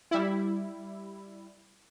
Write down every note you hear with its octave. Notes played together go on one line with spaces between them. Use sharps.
G3 E4